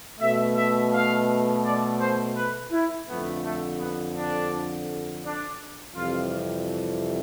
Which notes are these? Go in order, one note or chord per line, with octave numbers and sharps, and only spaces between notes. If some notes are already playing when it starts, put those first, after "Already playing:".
B2 A3 E5
E5
F5
D5
C5
B4
E4
F2 D3 A3 B3
A3
B3
D4
D4
F2 C3 E3 G3 F4